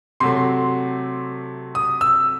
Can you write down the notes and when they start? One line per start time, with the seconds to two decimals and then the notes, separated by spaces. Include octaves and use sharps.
0.20 C3 F#3 A3 C6
1.75 D#6
2.01 E6